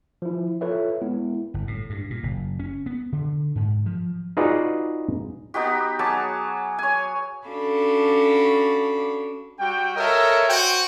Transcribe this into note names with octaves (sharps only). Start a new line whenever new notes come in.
F3 E4
F4 A4 B4 C#5 E5
G#3 B3 E4
G1
A2
G2
A#2
F#1
C#4
B3
D3
G#2
F3
D#4 F4 F#4 G#4 B4 D5
B3 D#4 F#4 G4
F#3 G#4 A5 D6
C#5 G#5
C#4 D4 F#4 A4 F5 B5
G3 F#4 G5
A4 A#4 C#5 D#5 E5
F#4 C5 G5